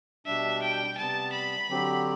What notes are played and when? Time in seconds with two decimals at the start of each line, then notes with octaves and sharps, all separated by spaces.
0.26 B2 G3 D4 E5
0.62 G5
0.97 C3 G3 B3 A5
1.33 B5
1.69 D3 F#3 C4 G4